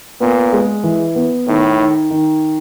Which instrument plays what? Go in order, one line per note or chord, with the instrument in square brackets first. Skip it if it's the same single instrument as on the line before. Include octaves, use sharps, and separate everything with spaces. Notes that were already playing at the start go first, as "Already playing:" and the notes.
[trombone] A#2 [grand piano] B3
[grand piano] G#3
E3
B3
[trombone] A2 [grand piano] D#3
[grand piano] D#3
D#3